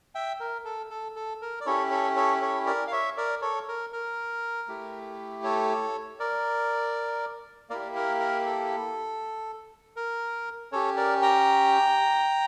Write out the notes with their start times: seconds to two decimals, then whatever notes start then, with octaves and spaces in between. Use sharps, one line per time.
0.15 E5 G5
0.40 A#4
0.65 A4
0.90 A4
1.16 A4
1.42 A#4
1.61 D5
1.66 C#4 E4 G4 A4 C#5
1.91 A4 C#5
2.16 A4 C#5
2.41 A4 C#5
2.66 A#4 D5
2.87 F5
2.92 C#5 E5
3.17 A#4 D5
3.42 A4 C#5
3.68 A#4
3.92 A#4
4.68 A3 E4 G4
5.44 A4 C#5
6.20 A#4 D5
7.70 A#3 E4 G4 A#4 D5
7.95 A#4
8.20 A#4
8.46 A4
9.96 A#4
10.72 C#4 G4 A4 C#5
10.97 A#4 D5
11.22 G5 A#5